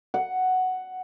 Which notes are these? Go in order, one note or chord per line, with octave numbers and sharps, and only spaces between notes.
F#5